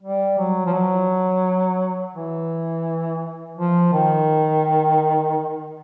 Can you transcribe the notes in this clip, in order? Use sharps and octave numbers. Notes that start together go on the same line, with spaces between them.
G3
F#3
F3
F#3
E3
F3
D#3